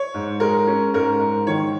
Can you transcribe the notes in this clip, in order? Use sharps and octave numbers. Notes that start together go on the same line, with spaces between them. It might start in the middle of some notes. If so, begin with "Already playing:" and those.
Already playing: C#5
G#2
G#3 A#4
C#4
G#2 A#4
G#2
D#3 C#5